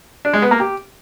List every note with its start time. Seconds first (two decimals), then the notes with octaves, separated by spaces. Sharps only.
0.25 D4
0.34 G#3
0.42 B3
0.51 A#3
0.60 G4